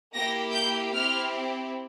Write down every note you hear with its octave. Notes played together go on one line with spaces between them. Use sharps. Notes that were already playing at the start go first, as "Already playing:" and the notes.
A#3 E4 G4 A#6
G6
C4 E4 G4 F6